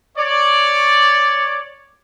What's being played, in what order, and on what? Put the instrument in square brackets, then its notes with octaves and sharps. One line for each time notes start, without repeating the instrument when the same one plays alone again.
[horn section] C#5 D5